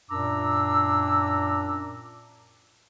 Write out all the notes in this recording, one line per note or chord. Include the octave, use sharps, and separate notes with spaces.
F#2 A#2 D4 A#5 D6 E6